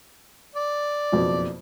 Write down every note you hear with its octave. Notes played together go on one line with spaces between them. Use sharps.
D5
F#1 F2 B2